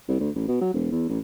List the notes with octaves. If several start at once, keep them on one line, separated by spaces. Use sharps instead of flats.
C2
D2
A1
B2
F#3
E1
E2
A1